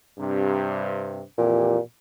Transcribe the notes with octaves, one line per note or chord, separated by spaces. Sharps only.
G2 C3
F2 A#2 E3 G4